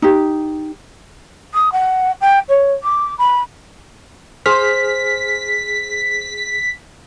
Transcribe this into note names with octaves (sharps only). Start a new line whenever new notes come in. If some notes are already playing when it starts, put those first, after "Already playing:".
D#4 G4
D#6
F#5
G5
C#5
D6
B5
G#4 C5 F6 B6